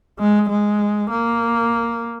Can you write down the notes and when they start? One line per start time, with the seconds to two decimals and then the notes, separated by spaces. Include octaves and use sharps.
0.20 G#3
0.49 G#3
1.10 A#3